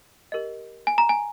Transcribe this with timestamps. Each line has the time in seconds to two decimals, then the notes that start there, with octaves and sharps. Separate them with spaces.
0.32 G4 A#4 D#5
0.87 G#5
0.98 A#5
1.09 G#5